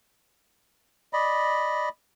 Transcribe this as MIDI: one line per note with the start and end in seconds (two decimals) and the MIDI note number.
1.13 1.89 74
1.13 1.89 75
1.13 1.89 83